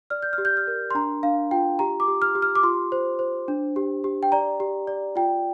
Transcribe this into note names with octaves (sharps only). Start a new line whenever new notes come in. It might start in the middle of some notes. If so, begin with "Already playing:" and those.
D5 F6
G6
F6
G4
G6
F6
A#4
C6
D4 A#5
D4 F5
F4 G5
G4 A#5
D6
G4
F6
G4
F6
D6
F4 C6
C5
C5
D4
G4
G4
G5
D5 A#5
G4
D5
F4 G5